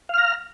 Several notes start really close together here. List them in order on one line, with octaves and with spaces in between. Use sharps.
F5 F6 A#5